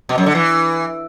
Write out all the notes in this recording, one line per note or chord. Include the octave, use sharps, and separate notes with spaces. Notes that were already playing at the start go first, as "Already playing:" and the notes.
B2
F#2
D3
E3